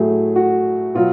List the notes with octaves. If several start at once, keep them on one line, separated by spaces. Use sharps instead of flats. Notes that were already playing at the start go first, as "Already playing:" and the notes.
Already playing: A2 F#3 A3 G#4
F#4
B2 F#3 F4